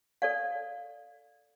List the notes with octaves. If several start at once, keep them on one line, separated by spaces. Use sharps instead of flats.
A4 D5 F5